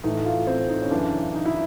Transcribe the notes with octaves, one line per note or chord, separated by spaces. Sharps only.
A2 E3 D#4
F4
C4
D#4
C#4
F#2 C#3 E3 D4
D#4
E4